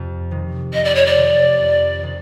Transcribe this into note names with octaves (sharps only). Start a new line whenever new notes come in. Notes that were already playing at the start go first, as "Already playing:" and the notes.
Already playing: F2 C3
C3 D#3
F2 D#5
D5
C#5
D5
C3 D#3
F2
C3 D#3